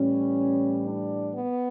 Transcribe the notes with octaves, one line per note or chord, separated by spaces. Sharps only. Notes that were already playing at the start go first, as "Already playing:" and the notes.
Already playing: A2 E3 G3 C#4
D4
B3